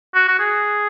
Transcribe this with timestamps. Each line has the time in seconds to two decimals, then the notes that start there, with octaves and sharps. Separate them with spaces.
0.15 F#4
0.28 F#4
0.39 G#4